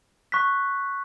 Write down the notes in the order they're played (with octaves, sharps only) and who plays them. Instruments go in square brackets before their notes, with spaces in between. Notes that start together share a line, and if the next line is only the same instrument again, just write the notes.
[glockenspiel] C#6 F#6 B6